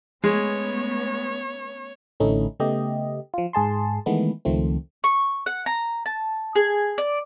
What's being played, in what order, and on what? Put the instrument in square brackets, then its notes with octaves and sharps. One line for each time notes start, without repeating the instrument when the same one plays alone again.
[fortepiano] G#3 [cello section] A3 B3 C#4 [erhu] C#5
[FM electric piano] A1 D3 A3 C#4 D#4 E4
C#3 A3 B3 G4 D#5
F3 F4
G#2 G#4 A5 C6
D#3 E3 G#3 A3 B3
C#2 D#3 F3 A3 C4
[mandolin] C#6
F#5
A#5
A5
G#4
D5